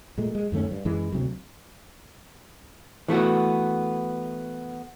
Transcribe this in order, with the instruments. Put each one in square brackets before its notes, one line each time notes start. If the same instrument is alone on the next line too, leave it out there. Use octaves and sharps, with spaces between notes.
[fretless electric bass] A#2 G#3 A3
G#3
F#2 D#3 A3 C#4
G2
F#2 E3 G#3
D2 C3 F#3
[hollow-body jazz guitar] E3 A3 B3 F#4